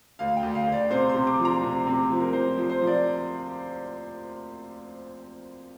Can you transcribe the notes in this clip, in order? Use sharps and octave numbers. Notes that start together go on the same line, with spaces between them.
D2 F5
G5
D2
F5
D2
D5
C3 C5
C6
C3
D6
F3
A#5
C3
C3
F3
A#4
F3 C5
F3
C5
F3
D5